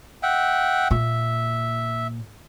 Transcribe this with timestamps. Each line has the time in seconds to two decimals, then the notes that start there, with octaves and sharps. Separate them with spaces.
0.23 E5 F#5 G5
0.91 A#2 E5